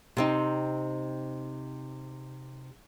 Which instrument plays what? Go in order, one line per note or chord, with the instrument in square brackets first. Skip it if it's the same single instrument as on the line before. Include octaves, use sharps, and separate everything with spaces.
[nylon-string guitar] C3 C4 D#4